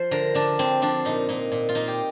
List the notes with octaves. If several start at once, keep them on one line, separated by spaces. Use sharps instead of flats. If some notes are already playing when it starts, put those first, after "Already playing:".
Already playing: F3 C5
D3 A#4
D3 D4
D3 C4
F3 D4
A#2 D#4
A#2 D#4
A#2
F4
A#2 D#4
G4